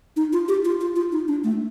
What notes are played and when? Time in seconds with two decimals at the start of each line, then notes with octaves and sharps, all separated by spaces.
0.16 D#4
0.33 F4
0.48 G4
0.65 F4
0.81 F4
0.96 F4
1.12 D#4
1.28 D4
1.44 A3